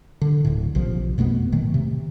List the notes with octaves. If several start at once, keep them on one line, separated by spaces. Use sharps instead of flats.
D3
D1 A2
A#1 C3 F3
F2 B2 A3 B3
A2 D#3 A3
C3